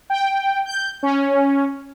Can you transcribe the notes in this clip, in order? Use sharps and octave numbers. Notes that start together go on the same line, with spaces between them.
G5
G6
C#4